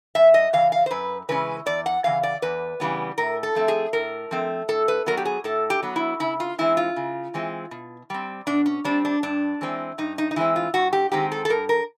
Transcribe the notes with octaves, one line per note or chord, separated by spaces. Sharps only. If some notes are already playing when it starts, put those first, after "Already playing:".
F#2 E5
D#5
C#3 E3 F5
F5
C5
F#2 B4
C#3 E3 G#3 C#4 B4
E2 D5
F#5
C#3 E3 F5
D5
E2 B4
C#3 E3 G3 B3
A2 A#4
A4
F3 A3 C4
G#4
A2 A#4
F3 A3 C4
A2 A4
B4
F#3 B3 A#4
G4
G#4
A2 A4
G4
F#3 B3
E4
C#3 E4
F4
E3 G#3 C4 E4
F4
C#3
E3 G#3 C4
B2
G3 C4
B2 D4
C#4
G3 C4 D4
D4
G2 D4
E3 G#3 C4
G2 D#4
D#4
D#4
E3 G#3 C4 E4
F4
G2 F#4
G4
D#3 G#3 C4 G4
A4
A4
G2 A#4
A#4